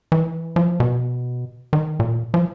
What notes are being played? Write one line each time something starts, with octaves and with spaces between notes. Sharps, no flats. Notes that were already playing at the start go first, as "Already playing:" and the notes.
E3
F3
B2
D#3
A#2
F3